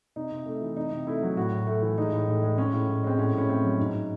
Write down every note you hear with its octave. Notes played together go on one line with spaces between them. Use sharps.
C3 D#4
C3
A3
E3
C3 D#4
C3
A3 E4
F#3
A2 F#4
A2
A3
E3
G#3 D#4
A2
A2
G#3
G#3 C#4
A2
A2
G#3 C4
A2 C#4
A2 C#4
A3 C4
F#3
G#2